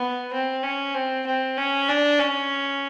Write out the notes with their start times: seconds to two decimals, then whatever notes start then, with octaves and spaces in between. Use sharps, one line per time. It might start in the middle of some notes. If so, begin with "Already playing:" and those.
Already playing: B3
0.33 C4
0.63 C#4
0.95 C4
1.26 C4
1.57 C#4
1.89 D4
2.19 C#4